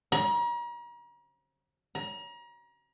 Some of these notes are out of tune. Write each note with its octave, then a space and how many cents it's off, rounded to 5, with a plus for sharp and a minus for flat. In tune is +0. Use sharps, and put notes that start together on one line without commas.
A#5 +40
A#5 +35